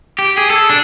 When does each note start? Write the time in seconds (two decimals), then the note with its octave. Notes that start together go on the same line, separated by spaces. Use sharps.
0.19 G4
0.38 G#4
0.50 A4
0.70 D4